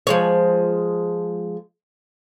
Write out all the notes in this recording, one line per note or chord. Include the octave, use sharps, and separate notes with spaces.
F3 G#3 C#5